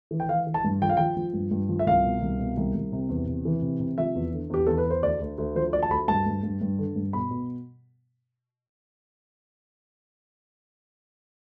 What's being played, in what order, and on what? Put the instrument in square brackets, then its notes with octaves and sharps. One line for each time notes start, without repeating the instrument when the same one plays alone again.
[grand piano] E3
G5
E3 F5
E3
A5
G2
F3 G5
F5
F3 G5
F3
G2
G2
F3
E5
C2 F5
B2
C2
B2
C2
C2
C3
E2
C3
E3
C3
C3
F3 E5
E2
D3
E2 G4
E2 A4
B4
E2 C5
D2 D5
D2
D2
F3 C5
D2 D5
A5
D2 B5
G2 A5
G2
G2
G2
D3
G2
B2 B5
B2